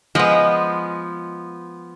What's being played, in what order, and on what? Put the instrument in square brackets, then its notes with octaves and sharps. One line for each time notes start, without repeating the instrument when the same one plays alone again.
[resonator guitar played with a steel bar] F3 B3 [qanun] G#3 D#5